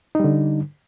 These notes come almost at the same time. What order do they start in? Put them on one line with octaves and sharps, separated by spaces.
D#4 G3 D3